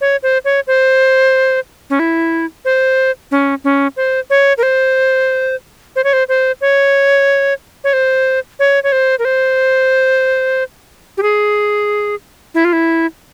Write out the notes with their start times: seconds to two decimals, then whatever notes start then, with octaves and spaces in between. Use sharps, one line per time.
0.01 C#5
0.23 C5
0.45 C#5
0.67 C5
1.90 C#4
1.99 E4
2.65 C5
3.31 C#4
3.64 C#4
3.97 C5
4.30 C#5
4.58 A#4
4.63 C5
5.96 C5
6.04 C#5
6.13 C5
6.29 C5
6.61 C#5
7.84 C#5
7.93 C5
8.59 C#5
8.84 C#5
8.92 C5
9.19 A#4
9.25 C5
11.17 G4
11.23 G#4
12.54 E4
12.65 F4
12.73 E4